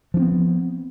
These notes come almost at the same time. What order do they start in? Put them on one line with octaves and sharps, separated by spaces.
F3 D4 C4 B3